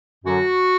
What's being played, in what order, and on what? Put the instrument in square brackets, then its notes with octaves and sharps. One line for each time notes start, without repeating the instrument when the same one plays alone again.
[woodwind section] F#2 D3 F#3 F#4